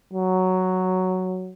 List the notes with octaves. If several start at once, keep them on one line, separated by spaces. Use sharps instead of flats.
F#3